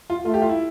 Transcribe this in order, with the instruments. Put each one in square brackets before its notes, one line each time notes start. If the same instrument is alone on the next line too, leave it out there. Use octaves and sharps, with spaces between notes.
[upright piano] F4
[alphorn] A3 [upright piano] F4
[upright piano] G4
F4
E4